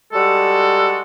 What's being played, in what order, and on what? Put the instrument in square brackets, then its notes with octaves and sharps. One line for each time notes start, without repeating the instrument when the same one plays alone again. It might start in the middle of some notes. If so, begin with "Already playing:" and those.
[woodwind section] G3 G#3 F#4 A4